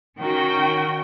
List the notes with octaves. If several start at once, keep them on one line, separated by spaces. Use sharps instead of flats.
D#3 C#4 F#4 G5